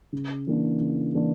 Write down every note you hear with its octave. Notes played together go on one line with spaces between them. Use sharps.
C#3
E3 A#3 D4
C#3
E3 A#3 D4